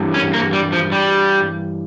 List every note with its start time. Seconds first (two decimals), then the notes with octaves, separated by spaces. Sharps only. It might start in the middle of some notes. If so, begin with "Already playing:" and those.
Already playing: G2 E3
0.14 C#4
0.34 A#3
0.53 G3
0.72 F3
0.92 G3